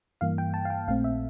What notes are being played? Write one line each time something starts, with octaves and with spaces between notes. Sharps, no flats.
G2 E3 A#3 F5
G5
A5
F5
G5
A#1 A#2 A3 C4 F5
E5